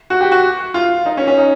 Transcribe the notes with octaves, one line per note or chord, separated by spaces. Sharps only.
F#4
G4
F#4
F4
D#4
C#4
C#4
D#4